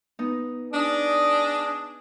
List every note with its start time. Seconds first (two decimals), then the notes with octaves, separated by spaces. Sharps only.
0.19 B3 D#4
0.73 D4 D#4 G#4 D5 D#5